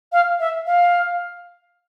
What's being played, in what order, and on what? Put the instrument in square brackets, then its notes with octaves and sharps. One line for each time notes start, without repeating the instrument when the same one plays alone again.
[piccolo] F5
E5
F5